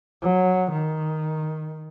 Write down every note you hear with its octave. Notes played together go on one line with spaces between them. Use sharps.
F#3
D#3